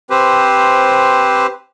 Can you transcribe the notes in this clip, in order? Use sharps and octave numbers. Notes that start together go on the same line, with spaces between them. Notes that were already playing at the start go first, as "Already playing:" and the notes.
C4 G4 B4 C5